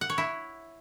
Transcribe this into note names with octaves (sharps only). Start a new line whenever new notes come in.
F#5
C#5
E4